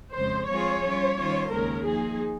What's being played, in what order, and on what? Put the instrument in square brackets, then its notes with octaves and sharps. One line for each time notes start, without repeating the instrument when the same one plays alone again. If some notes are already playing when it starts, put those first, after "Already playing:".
[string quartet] F2 C#3 G#3 [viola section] C5
[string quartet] F3 G#3 C4 F4 G#4 [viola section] C#5
[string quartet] G3 C#4 F4
D#3 G3 C#4 F4 C5
[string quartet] D#2 C#3 G#3 C#4 [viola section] A#4
[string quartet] F3 A#3 D#4 [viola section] G#4